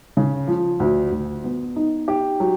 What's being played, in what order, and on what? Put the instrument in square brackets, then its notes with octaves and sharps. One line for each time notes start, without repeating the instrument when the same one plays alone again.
[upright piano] C#3
F3
D2
D2
B3
D#4
G4
F#3